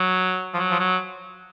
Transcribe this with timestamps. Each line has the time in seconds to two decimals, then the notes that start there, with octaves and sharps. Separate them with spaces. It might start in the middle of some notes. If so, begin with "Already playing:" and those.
Already playing: F#3
0.54 F3
0.57 F#3
0.71 F3
0.79 F#3